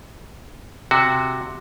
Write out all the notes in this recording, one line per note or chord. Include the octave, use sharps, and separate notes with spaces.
C3 F#4